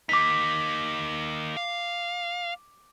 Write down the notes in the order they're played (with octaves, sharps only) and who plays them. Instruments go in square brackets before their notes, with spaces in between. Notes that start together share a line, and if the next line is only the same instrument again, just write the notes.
[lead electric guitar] A#3 D#4 [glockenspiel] D6 B6
[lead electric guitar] F5